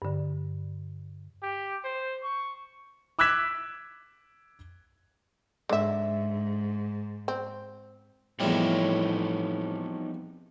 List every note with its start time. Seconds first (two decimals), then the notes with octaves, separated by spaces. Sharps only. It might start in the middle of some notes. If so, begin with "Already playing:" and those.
0.02 G2 D3
1.43 G4
1.84 C5
2.23 C#6
3.19 D6 E6 F#6 G#6 B6 E7
5.69 G#2 D3 E5
7.28 C4
8.40 E2 A2 F3 G3 C4 D#4 C#5